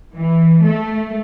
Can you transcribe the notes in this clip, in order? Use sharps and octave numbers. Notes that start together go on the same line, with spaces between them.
E3
A3